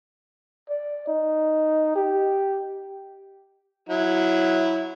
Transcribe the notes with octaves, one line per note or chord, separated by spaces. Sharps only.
D5
D#4
G4
F#3 E4